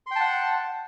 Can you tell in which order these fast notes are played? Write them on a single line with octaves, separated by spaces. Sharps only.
C6 G5 A5 F#5